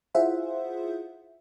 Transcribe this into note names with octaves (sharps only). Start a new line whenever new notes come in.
E4 F4 G#4 C5 E5 F#5